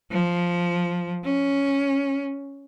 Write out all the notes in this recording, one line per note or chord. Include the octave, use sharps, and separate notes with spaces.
F3
C#4